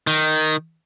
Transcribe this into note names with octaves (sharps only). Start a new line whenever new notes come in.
D#3